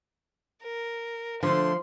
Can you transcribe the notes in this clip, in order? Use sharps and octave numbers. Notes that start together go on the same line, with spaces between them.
A#4
D3 F3 A3 C6